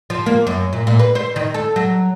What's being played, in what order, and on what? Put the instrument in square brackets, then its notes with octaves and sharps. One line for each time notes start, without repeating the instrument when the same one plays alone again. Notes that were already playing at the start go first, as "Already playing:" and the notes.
[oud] F3
A#3
F#2
A#2
A#2
B4
C5
D#3
A4
F#3